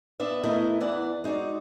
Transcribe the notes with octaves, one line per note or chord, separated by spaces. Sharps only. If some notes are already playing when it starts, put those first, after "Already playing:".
B3 D4 E5
A3 B3 E4 A#4 D#5
E2 E3 D5 F#5
G#3 D#4 F#4 D5